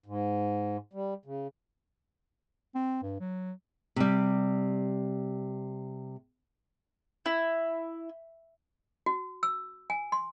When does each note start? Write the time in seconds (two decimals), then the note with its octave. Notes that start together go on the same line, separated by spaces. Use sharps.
0.06 G#2
0.93 G3
1.25 C#3
2.75 C4
3.03 G2
3.20 F#3
3.96 C3 G3
7.26 E4
9.06 F#4
9.43 E6
9.90 G#5
10.12 C6